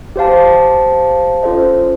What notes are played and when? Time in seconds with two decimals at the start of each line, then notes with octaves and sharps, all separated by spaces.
0.16 G4 C5 F5 A5
1.43 C#4 F4 A4 C5 D#5